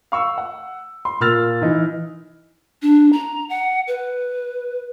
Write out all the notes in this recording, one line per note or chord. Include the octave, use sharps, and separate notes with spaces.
F5 C#6 E6
F#5
C6
A#2 A#3 E6 F6 A6 F7
E3 D#4
D4
A#5
F#5
B4